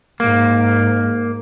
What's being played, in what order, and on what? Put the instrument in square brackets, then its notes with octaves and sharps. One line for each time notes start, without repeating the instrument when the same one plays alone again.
[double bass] G#2 [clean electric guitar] A#3